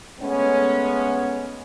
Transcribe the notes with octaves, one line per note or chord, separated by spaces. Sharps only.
G#3 A3 B3 C#4